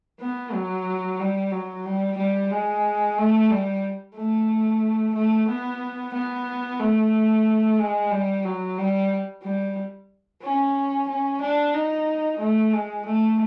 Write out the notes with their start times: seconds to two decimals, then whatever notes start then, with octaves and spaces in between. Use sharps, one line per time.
0.21 B3
0.53 F#3
1.20 G3
1.52 F#3
1.86 G3
2.18 G3
2.51 G#3
3.18 A3
3.51 G3
4.16 A3
5.15 A3
5.49 B3
6.14 B3
6.79 A3
7.79 G#3
8.12 G3
8.45 F#3
8.78 G3
9.43 G3
10.42 C#4
11.09 C#4
11.42 D4
11.74 D#4
12.40 A3
12.73 G#3
13.06 A3